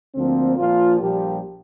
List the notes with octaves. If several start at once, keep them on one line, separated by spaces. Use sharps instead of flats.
D2 D3 F3 A#3 C4
A#1 A#2 F3 A#3 F4
A#1 A#2 F3 G3 A#3 G4